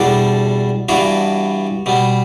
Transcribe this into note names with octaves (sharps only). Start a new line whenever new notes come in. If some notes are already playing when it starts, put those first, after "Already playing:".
Already playing: E2 B2 G3 D4 A4
G2 E3 B3 D4 F#4
B2 G3 B3